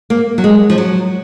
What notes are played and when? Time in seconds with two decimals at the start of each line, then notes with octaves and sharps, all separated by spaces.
0.10 A#3
0.38 F#3
0.44 G#3
0.70 F3
0.78 F#3